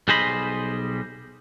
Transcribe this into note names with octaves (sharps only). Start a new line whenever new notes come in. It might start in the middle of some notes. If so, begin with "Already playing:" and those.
B1 G3 G#4 C5 D#5 B5